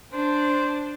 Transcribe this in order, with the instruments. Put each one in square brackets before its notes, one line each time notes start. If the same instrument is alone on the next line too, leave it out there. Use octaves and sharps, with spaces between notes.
[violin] D4 [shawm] C5